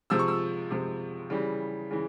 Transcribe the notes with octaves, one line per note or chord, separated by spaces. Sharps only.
C3 F3 G#3 E6
C#6
E6
C3 F3 G#3
C#3 E3 G3
C#3 E3